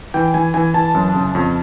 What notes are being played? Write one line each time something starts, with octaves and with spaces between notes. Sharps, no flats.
E3 G5
E3 G#5
E3 G#5
E3 A5
F#2
C#3
F2